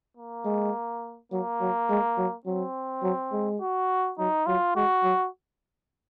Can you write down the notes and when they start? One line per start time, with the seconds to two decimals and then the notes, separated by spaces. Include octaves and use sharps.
0.17 A#3
0.45 G#3
1.32 F#3 A#3
1.61 F#3
1.89 G#3
2.18 F#3
2.46 F#3 C4
3.03 F#3
3.32 G#3
3.61 F#4
4.19 F#3 D#4
4.46 F#3 F4
4.76 G#3 F#4
5.04 F#3